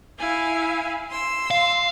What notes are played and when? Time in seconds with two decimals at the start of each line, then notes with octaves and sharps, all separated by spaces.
0.19 E4 F5 G#5
1.10 C6 E6
1.51 F5